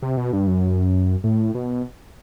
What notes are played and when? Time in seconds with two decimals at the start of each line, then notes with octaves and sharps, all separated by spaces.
0.02 C3
0.17 B2
0.33 G2
0.47 F#2
1.24 A2
1.55 B2